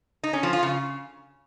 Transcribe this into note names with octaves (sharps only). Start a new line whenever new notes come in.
D#4
C#4
F3
F4
C#3